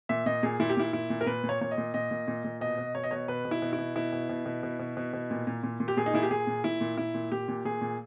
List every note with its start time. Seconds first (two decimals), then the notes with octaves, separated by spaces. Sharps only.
0.09 A#2 E5
0.26 A#2 D#5
0.43 A#2 G#4
0.60 A#2 E4
0.70 G4
0.77 A#2 E4
0.93 A#2 E4
1.10 A#2
1.21 A#4
1.26 A#2 B4
1.43 A#2
1.49 C#5
1.61 A#2 C#5
1.71 D#5
1.78 A#2
1.94 A#2 D#5
2.11 A#2
2.28 A#2
2.44 A#2
2.61 B2 D#5
2.78 B2
2.95 B2 C#5
3.03 D#5
3.11 B2 C#5
3.28 B2 B4
3.45 B2
3.51 E4
3.62 B2
3.73 E4
3.78 B2
3.96 B2 E4
4.13 B2
4.29 B2
4.46 B2
4.63 B2
4.79 B2
4.97 B2
5.13 B2
5.31 A#2
5.47 A#2
5.63 A#2
5.80 A#2
5.88 G4
5.97 A#2 G#4
6.06 D#4
6.14 A#2 E4
6.23 G4
6.31 A#2 G#4
6.47 A#2
6.64 A#2 E4
6.81 A#2
6.97 A#2 E4
7.14 A#2
7.31 A#2 G4
7.48 A#2
7.65 A#2 G#4
7.81 A#2